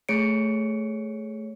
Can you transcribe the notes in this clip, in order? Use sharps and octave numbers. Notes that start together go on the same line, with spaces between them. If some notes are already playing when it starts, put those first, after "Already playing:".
A3 G#4 C#5 C#7 D7